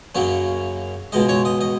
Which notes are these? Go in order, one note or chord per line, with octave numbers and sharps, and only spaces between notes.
F#2 C#3 F#3 A#3 C#4
C#2 B2 G#3 D#5
C#5
D#5
D#5